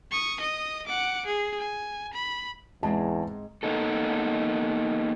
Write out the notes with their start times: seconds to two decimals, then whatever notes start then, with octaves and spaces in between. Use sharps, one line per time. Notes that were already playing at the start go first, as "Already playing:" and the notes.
0.11 C#6 D#6
0.40 D#5 D#6
0.86 F#5 D6
1.26 G#4
1.59 G#5
2.13 B5
2.83 E2 G#2 G#3 C4 A5
3.63 A#3 B3 D#4 A4